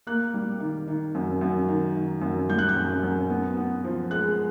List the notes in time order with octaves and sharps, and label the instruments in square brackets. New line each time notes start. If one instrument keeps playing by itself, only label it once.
[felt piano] A#3 F#6
G3
D#3
D#3
F#2
F#2
D#3
D#3
F#2
G3 G6
F#6
G6
F#2
F#2
B3
B3
F3
G#3 F#6